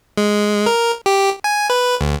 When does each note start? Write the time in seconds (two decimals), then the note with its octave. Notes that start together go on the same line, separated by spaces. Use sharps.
0.18 G#3
0.66 A#4
1.06 G4
1.44 G#5
1.70 B4
2.01 D2